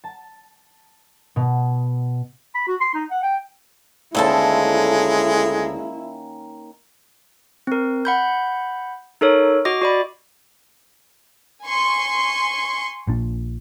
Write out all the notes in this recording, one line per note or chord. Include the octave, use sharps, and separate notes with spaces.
A5
B2
B5
F#4
C6
D#4
F#5
G5
D2 D#3 G#3 A#3 C#4 E4 A4 A5
C4 A#4
F#5 B5 G6
D#4 A4 A#4 C#5
F#4 D#5 D6 A#6
F#4 D5 B5
G#5 C6 C#6
A#1 A#2 D4